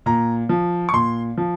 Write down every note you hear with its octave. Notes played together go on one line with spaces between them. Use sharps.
A#2 A#5
F3
C#6
A#2 C6
F3